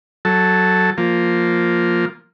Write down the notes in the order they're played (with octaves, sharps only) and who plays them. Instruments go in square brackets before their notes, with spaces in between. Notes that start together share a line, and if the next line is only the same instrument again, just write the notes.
[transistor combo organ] F#3 A4
F3 A#3